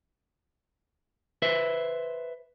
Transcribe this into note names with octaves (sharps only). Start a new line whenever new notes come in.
B4 C5 E5